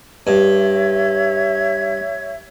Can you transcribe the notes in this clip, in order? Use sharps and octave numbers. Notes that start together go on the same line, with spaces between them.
G2 C#5 E5 G#6